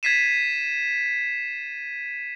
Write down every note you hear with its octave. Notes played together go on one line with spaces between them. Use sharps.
G#6 A6 B6 C7 D#7 E7